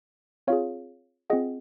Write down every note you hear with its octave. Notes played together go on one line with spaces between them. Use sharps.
C4 F4 G#4 C#5 F5
C4 F4 G#4 D#5 F#5